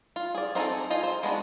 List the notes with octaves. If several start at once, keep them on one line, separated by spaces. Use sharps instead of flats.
F4
G#4 D5
C4 D#4 F#4 G#4 A4
F4 D#5 G5 G#5
C5
G#3 B3 D4 F#4